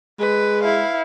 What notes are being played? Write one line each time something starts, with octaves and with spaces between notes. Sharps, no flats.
G#3 B4
E4 F5